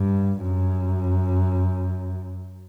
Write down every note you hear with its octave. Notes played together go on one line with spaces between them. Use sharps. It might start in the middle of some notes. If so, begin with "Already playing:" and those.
Already playing: G2
F#2